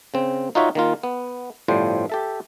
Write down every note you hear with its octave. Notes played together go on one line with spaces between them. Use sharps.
C#3 C4
D#4 F4 F#4 C#5 E5
D#3 A#3 F4
B3
G1 A2 F3 G3 C5
G4 A4 E5